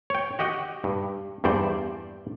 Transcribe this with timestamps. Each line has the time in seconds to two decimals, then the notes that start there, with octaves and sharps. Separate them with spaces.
0.10 C#5 G5
0.39 F#4 G4 D#5 F#5 G5
0.84 G2
1.44 E2 G2 C5 D5 G5